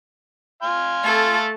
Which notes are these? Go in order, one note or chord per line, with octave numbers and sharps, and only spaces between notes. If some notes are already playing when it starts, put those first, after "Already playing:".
F5 G#5 C6
A3 A4